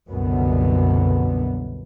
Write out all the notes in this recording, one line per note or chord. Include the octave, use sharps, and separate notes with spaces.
C2 F#2 B2 D3 B3